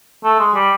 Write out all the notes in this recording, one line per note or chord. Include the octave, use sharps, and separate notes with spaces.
A3
G#3
G3